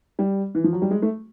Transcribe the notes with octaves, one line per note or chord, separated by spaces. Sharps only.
G3
E3
F3
F#3
G3
G#3
A3